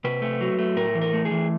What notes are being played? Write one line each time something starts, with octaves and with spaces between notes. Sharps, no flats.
C3 B4
A3
F#3
A3
A2 A#4
E3
A#4
A3
G#4
E3